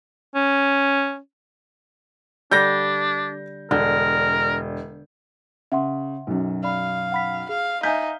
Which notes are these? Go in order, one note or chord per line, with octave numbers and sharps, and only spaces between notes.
C#4
D3 G3 D4 G6 A#6
E1 D3 A#4
C#3 E5 F#5 C6
B1 F#2
D5 F5 B5
F#5 B5 B6
G#4 F5
D#4 E5 G#5 G6 B6